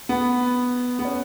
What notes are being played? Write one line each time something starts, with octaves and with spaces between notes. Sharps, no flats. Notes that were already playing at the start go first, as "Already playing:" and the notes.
B3
B3
C#4